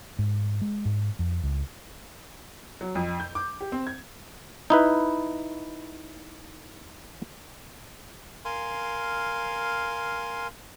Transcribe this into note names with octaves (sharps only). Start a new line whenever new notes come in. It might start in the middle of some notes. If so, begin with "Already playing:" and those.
G#2
G#3
G#2
F2
C#2
F#3
F2
G6
D6
G4
C4
G#6
D#4 E4 B4
A#4 F5 G#5 C6